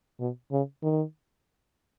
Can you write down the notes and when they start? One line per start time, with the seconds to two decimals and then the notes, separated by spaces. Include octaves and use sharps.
0.19 B2
0.52 C#3
0.83 D#3